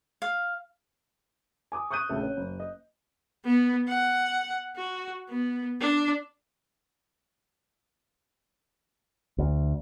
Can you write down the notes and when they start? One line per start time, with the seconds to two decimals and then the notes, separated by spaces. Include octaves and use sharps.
0.22 F5
1.72 G#5 D6 D#6
1.91 C#6 D#6 F#6 G6 D#7
2.09 A#1 C#3 A3
2.23 C#4
2.37 F#1
2.60 D#5
3.45 B3
3.88 F#5
4.76 F#4
5.30 B3
5.80 D4
9.38 D2